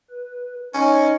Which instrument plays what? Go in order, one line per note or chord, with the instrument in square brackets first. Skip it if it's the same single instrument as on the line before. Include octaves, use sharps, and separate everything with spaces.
[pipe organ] B4
[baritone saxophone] C#4 [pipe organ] D#4 C#5 D#5